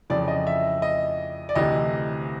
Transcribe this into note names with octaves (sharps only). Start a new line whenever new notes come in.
F2 C#3 E3 D5
D#5
E5
D#5
D5
D2 C3 E3 D#5